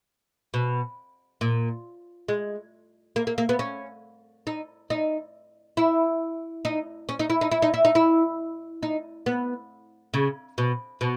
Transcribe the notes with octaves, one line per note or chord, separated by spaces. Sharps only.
B2
A#2
G#3
A#3
A#3
A#3
B3
C#4
D#4
D#4
E4
D#4
C#4
D#4
E4
D#4
E4
D#4
E4
D#4
E4
D#4
B3
C#3
B2
B2